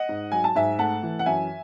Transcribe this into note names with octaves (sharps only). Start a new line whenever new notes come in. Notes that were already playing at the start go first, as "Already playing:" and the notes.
Already playing: D#5 F#5
G#2
F#3 G#5
A5
G#2 E5 G#5
A3 F#5 A5
E3
F#5
F#2 E5 G#5